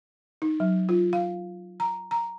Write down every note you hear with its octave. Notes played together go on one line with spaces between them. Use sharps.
D#4
F#3
F4
F5
A#5
A#5